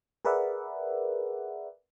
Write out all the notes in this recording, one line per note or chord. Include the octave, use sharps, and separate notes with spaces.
G#4 A#4 B4 D5 E5 F#5